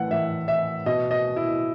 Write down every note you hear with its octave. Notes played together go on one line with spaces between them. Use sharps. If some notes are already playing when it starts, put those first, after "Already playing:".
Already playing: A2 E3 F#5
A2 E3 E5
E5
B2 D#5
D#5
E4